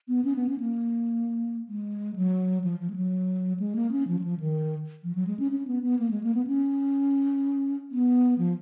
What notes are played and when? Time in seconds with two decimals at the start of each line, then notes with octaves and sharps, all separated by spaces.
0.08 B3
0.25 C#4
0.36 B3
0.49 C#4
0.60 A#3
1.68 G#3
2.16 F#3
2.64 F3
2.80 F3
2.90 G#3
2.96 F#3
3.59 G#3
3.76 A#3
3.92 C#4
4.08 F3
4.19 F#3
4.24 F3
4.40 D#3
5.04 F3
5.15 F#3
5.27 G#3
5.39 C#4
5.52 C#4
5.67 B3
5.83 B3
5.99 A#3
6.11 G#3
6.23 A#3
6.35 B3
6.47 C#4
7.91 B3
8.38 F3